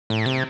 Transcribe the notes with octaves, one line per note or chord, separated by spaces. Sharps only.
A2
C3